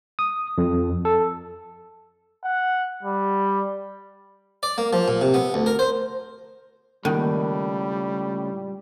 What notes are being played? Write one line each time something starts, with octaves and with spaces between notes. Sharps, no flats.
D#6
F2
A4
F#5
G3
D5
A#3
F3
A#2
C3
B3
D2
A#4
C5
C#2 A2 D#3 G3 A#3